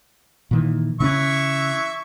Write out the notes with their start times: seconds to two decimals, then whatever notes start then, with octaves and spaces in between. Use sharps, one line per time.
0.51 A#2 D#3 E3
1.00 C#3 E3 C4 C#4 E5 C#6